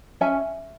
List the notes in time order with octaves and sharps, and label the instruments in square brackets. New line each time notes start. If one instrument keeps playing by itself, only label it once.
[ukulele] C#4 E5 G#5